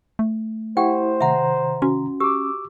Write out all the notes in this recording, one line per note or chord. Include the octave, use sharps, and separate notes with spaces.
A3
E4 G4 C5 F#5 G5
C3 D#3 E5 F#5 A#5
C#4 F#4
G4 D6 E6